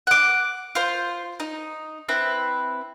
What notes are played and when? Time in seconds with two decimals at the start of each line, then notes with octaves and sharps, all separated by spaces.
0.07 F#5 D6
0.75 F4 C5
1.40 D#4
2.09 C4 E4 B4